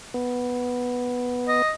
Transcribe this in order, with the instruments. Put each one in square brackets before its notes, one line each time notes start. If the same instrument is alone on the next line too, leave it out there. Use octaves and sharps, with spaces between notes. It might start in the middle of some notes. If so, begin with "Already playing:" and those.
[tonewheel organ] B3
[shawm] D#5